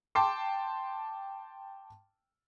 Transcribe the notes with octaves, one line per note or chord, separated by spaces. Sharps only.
G5 A5 C6 D6